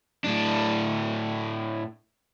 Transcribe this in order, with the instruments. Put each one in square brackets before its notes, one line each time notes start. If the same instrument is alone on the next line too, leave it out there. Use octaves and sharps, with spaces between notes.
[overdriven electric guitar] A2 D4